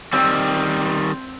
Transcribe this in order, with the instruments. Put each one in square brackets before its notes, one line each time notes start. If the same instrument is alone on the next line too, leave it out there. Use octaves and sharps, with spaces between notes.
[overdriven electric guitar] D#3 G3 [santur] C4